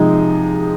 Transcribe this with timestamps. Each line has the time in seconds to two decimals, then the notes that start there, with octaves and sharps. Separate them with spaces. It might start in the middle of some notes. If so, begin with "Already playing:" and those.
Already playing: C3 F3 G#3 D#4